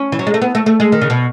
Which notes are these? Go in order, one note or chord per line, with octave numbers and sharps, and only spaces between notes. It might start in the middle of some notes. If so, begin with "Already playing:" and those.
Already playing: C#4
E3
F#3
G#3
A3
B3
A3
A3
G#3
D#3
C#3
B2